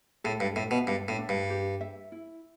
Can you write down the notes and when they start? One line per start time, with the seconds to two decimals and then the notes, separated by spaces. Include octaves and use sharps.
0.24 A2 A4
0.40 G2
0.56 A2 E5
0.71 B2
0.87 G2 D4
1.08 A2
1.18 D4
1.29 G2
1.50 G4
1.81 E5
2.12 E4